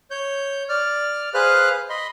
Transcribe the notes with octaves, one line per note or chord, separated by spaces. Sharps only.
C#5 G6
D5 F6
G#4 B4 C5 F5 F6 F#6
D#5 B5 C6